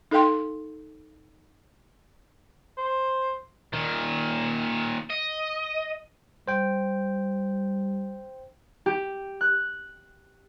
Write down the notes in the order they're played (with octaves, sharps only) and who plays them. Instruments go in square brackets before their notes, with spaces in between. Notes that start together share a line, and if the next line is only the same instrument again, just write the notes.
[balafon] D#4 A4 F5 G5 C6
[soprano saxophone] C5
[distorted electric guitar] A#2 D#3
D#5
[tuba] G3 [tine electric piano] C5 G5
[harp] G4
F#6